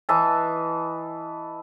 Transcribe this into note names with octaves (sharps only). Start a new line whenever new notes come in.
E3 D#5 E5 A5